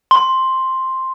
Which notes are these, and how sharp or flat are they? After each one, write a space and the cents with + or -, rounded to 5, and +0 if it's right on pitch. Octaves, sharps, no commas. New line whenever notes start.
C6 +5